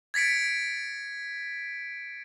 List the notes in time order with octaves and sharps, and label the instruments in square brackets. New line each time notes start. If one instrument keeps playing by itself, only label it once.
[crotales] G#6 A6 B6 C#7 D7